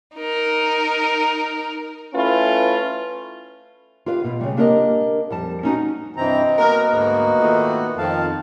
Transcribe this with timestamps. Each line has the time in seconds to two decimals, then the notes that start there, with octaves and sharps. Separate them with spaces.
0.17 D#4 A#4
2.15 A3 C#4 E4 F4 B4
4.06 F4 G4 B4 F5
4.24 B2
4.41 C#3 G3
4.57 A#3 D4 G4 A#4 C5 D#5
5.30 F2 G3 A5
5.63 C#4 D#4 F#4
6.17 G2 C3 E3 C4 D#5 A#5
6.58 A#3 B3 F#4 A#4
6.93 D2 G#2
7.38 A#2 D#3 A3
7.98 F2 D#3 F5 A5